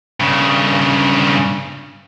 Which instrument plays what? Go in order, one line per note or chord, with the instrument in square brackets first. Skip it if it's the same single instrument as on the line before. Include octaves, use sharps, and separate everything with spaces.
[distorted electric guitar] G2 C#3